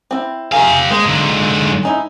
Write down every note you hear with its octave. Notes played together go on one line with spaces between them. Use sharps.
C4 E4
G4 G#4 A#4 E5 F5
G#3 A#3 C5
G#2 D3
G#3 D#4 E4